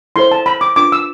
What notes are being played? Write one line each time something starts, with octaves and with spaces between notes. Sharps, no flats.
E4 A4 C5 C6
A5
B5
D6
D4 F4 B4 D6
E6